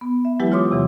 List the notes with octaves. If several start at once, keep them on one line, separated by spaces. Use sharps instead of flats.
B3
E5
E3 F#3 G#3 E4 G4 B4
F4 C#5 C6 D6 D#6
E2 C3 E3 F#3